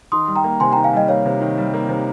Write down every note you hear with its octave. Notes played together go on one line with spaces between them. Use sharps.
D#3 C6 D#6
G3
G5 A#5
A#3
C3 G#5 C6
D#3 G5 A#5
F5 G#5
G3 D#5 G5
A#3 C#5 F5
C3
D#3
G3
A#3
C3